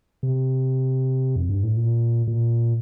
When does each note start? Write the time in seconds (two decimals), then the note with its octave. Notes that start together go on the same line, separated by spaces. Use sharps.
0.23 C3
1.36 F2
1.49 G2
1.63 A2
1.77 A#2
2.27 A#2